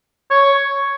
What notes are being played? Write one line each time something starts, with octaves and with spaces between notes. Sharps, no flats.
C#5